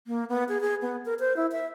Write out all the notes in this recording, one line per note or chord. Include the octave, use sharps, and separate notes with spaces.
A#3
B3
G#4
G#4
B3
A#4
C5
E4
E5